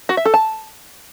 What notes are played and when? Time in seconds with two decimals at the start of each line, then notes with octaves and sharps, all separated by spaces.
0.09 F#4
0.17 E5
0.25 A4
0.34 A5